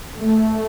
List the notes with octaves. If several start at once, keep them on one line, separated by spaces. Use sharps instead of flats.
A3